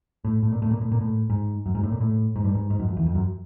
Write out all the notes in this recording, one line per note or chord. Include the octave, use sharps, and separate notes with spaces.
A2
A2
A#2
A2
A#2
A2
A#2
A2
G#2
F#2
G#2
A2
A#2
A2
G#2
G2
G#2
G#2
F#2
F2
E2
F2
F#2